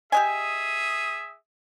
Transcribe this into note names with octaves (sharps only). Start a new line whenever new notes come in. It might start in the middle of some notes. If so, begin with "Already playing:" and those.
G4 G#4 D#5 E5 G#5 D#6